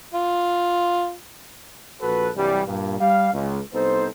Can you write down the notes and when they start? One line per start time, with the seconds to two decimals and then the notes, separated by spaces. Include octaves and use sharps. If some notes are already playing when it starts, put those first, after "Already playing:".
0.15 F4
2.01 A#1 F#4 A4 B4
2.36 C2 G2 E3 F#3 G3
2.67 G2 A#2
2.99 G3 F5
3.33 C#2
3.74 C2 B3 D#4 A4 C5